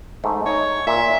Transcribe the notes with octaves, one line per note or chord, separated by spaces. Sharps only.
G#2 A3
D#4 C#5
A#2 E5